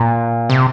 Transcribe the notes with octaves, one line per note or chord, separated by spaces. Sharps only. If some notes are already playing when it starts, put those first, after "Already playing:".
Already playing: A#2
C3